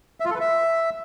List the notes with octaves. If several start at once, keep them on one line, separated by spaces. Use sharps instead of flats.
E5
F4
A4
B4
E5